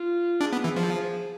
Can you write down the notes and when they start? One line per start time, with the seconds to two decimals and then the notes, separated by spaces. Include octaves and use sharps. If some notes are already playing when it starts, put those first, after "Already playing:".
Already playing: F4
0.41 D4 G#4
0.53 B3
0.64 E3
0.76 F3